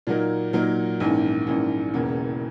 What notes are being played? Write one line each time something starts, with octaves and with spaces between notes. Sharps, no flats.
A#2 F#3 A#3 D#4 A#4
A#2 F#3 A#3 D#4 A#4
A#1 G#2 E3 A#3 C#4
A#1 G#2 E3 A#3 C#4
E1 E2 C#3 E3 A#3